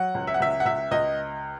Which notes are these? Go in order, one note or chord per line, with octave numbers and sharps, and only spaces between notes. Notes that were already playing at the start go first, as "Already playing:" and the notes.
Already playing: F#3 F#5
C#2
E5
F#5
C#2 E5
F#5
C#2 E5
C#2 D#5